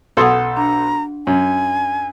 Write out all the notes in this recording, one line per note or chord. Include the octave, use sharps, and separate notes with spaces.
B1 A4 F#5 C6 D#6 G#6
D4 A#5
F#2 G#5